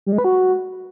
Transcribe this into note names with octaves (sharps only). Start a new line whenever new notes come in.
G3
G#3
B4
F#4